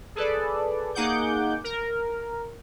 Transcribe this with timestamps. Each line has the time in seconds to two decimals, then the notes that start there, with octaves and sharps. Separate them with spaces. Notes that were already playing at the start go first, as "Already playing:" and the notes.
0.16 G#4 A4 B4 D5
0.95 A#3 D#4 G#4 F#5 D6 G6
1.64 A#4